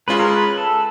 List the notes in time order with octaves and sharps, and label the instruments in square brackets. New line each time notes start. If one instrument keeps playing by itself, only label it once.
[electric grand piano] G#3 C#4 F4 G#4 [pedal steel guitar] B4
[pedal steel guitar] A#4
B4
A4